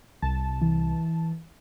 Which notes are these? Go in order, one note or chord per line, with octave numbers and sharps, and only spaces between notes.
C2 A5
E3